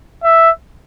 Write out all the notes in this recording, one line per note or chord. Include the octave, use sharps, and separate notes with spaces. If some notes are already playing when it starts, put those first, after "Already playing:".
E5